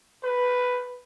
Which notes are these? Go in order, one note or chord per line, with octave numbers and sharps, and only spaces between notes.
B4